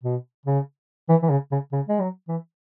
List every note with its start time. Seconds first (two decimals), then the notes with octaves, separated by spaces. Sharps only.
0.03 B2
0.46 C#3
1.09 E3
1.23 E3
1.30 C#3
1.52 C#3
1.72 C#3
1.88 G#3
2.00 F#3
2.28 E3